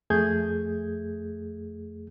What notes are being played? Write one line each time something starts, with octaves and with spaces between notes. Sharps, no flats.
F2 A3 G#4 G6 G#6